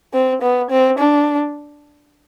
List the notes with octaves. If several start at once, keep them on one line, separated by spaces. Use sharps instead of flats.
C4
B3
C4
D4